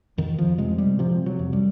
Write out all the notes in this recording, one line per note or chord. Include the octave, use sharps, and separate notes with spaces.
F2 D#3
F3
C3 G#3
G3
C3 F3
F#3
F2
G3